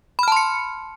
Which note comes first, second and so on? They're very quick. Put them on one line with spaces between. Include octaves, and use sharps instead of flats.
B5 F6 A5 C6 C#7